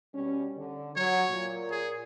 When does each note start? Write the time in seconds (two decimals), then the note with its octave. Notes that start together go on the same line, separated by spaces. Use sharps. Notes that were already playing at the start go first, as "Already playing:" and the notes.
0.15 B2 G3 C#4
0.57 D3
0.96 F#3 C#5
1.30 A#2
1.71 G#4